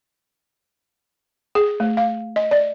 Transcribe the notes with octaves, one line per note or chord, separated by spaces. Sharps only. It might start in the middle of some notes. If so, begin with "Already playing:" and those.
G#4
A3
F5
D#5
D5